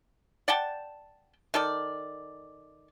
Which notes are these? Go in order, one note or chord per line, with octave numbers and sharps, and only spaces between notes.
D5 F#5 G5 A5
D#3 A4 D5